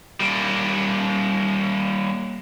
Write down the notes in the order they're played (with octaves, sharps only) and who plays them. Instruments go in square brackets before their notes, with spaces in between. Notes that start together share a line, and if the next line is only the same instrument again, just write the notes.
[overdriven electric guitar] G3 A#3